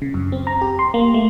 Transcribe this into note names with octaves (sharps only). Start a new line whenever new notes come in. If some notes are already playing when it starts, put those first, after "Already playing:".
C#3
F#2
C4
A#5
G4
C6
A#3
A3